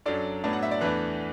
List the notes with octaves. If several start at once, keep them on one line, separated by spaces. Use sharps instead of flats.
F#2 F#3 D4 A4 D5
A2 F#3 B3 D4 A5
F#5
E5
D5
E2 E3 A3 D4 B4